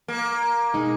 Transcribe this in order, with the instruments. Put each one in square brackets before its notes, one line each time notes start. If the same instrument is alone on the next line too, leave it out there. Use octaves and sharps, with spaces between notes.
[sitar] A#3
[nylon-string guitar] B2 G#3 D#4 A#4